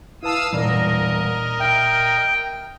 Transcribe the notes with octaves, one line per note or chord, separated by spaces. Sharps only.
E4 B4 F5 A5 D#6 E6
E1 A1 G2 A#2 A#4 D5 D#5
E5 G5 F6